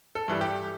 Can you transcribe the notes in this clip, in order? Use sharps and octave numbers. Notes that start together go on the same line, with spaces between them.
A4
G2 E3 G3
G4